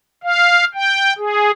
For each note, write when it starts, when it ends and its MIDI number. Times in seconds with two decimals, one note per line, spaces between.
0.23 0.64 77
0.74 1.13 79
1.18 1.51 68